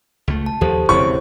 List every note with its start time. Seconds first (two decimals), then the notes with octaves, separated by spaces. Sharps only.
0.28 C#2 A3
0.46 A5
0.61 D#2 F3 G4 A4 C5
0.89 E1 C#3 C4 E4 C5 C#5 C#6